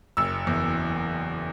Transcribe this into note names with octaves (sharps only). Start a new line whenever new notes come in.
F#1 E6
E2